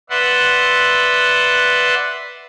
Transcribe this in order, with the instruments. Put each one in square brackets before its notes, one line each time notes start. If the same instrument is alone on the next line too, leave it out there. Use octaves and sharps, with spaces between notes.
[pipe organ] B4 D5 E5 F#5 C6